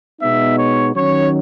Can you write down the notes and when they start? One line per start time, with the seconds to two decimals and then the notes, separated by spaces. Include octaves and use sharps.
0.21 B2 G#3 B3 D#4 E5
0.59 C#5
0.95 D#3 F#3 C#4 C#5